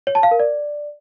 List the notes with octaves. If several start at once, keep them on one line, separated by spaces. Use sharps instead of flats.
C#5
A5
F5
A#4
D5